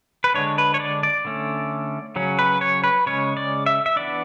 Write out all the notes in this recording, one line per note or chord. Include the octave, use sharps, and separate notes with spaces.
B4
D3 G#3 D4 C#5
B4
C#5
D5
D5
D3 A3 C#4
C#3 F#3 C#4
B4
C#5
B4
C#3 G#3 C#4 C#5
D5
E5
E5
E3 B3 D4 D5